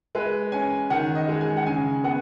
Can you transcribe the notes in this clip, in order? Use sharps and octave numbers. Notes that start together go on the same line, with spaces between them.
G#3 B4
C#4 G#5
D#3 F#5
D#5
G#3
G#5
F#5
C#3 G#5
B3 F#5